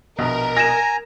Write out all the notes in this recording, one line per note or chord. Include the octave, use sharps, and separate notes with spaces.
A#1 B2 A#4
G#5 A#5 A#6 E7